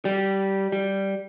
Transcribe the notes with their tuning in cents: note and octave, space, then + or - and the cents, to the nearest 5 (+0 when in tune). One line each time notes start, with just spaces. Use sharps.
G3 -15
G3 -5